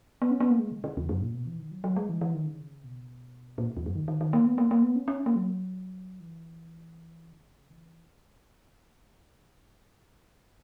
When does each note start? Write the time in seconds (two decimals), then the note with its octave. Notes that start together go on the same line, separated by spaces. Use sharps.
0.22 B3
0.31 C#4
0.40 B3
0.50 A#3
0.59 G#3
0.72 C#3
0.84 C#3
0.97 E2
1.09 F#2
1.21 A#2
1.34 B2
1.46 E3
1.59 D#3
1.71 F#3
1.84 F#3
1.96 G#3
2.09 E3
2.21 E3
2.34 D#3
2.46 C#3
2.84 B2
3.58 A#2
3.77 E2
3.86 F#2
3.96 D#3
4.08 D#3
4.21 D#3
4.33 A#3
4.46 B3
4.58 A#3
4.71 A#3
4.83 B3
4.96 C#4
5.08 C#4
5.26 A#3
5.36 F#3
6.20 E3
7.32 C#3
7.70 E3